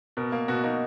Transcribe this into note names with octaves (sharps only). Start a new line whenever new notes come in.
B2 A#4
A#3
B2 F#4
A#3 D#4